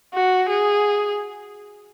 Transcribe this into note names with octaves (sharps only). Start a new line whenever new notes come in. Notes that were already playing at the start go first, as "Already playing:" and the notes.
F#4
G#4